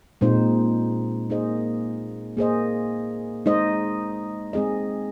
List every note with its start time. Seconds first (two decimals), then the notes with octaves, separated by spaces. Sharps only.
0.21 A#2 G#3 C4 D#4 C5
1.30 A#3 D#4 G#4 C5 D#5
2.37 A#3 G#4 C5 D#5
3.46 G#3 D#4 C5 D#5
4.53 G#3 C4 G#4 D#5